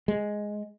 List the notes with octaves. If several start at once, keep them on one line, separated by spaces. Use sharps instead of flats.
G#3